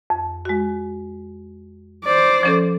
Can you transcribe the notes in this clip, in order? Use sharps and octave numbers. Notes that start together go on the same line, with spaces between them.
F2
G#3 F#4
C5 D5
F3 C#4 A4